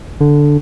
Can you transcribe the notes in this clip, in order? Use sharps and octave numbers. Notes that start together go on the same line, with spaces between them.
D3